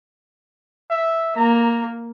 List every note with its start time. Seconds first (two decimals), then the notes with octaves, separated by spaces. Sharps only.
0.90 E5
1.36 A#3 A#5